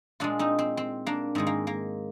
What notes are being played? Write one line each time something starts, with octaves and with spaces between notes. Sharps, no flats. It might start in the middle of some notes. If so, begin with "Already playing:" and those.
A#2 G#3 D4 F4
C4 D#4
C4
C4
A#3 D4
G#2 D#3 G#3 C4
A#3
A#3